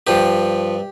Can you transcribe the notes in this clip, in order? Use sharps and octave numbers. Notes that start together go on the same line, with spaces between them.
G2 F3 G4